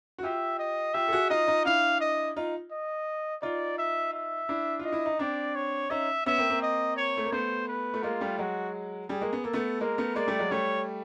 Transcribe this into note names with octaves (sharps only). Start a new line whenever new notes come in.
F#4
F4 G4 E5
D#5
F4 G4 E5
A4
F#4 G#4
D#4 F4 D#5
D#4 F4
D4 E4 F5
D#5
D#4 F4
D#5
D#4 F4 D5
E5
E5
D4 E4
F4 D#5
E4
D#4
C4 D4 D5
C#5
C#4 D#4 E5
B3 C#4 E5
A#3 C4
A#3 C4
D#5
C#5
A3
A#3
A3 B3 C5
B4
A3
G#3 A#3 F4
G3 A3
F#3 G#3 F#4
G3 G#4
G#3 A#3
B3
A#3 A4
A3 B3
G#3 A#3 A#4
A3 B3
G#3 A#3 D5
G3 A3
F#3 G#3
G3 A3 C#5